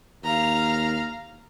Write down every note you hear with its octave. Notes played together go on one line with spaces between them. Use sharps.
D#2 F5 A#5